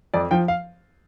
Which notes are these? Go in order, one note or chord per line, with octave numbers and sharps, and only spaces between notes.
F2 D5
F3 G5
F5